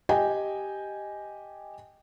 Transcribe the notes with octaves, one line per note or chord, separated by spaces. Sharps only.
G4 D#5 G5 G#5